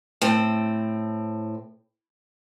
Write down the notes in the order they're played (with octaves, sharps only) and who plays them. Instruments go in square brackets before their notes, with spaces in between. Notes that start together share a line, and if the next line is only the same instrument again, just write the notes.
[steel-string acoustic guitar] A2 C4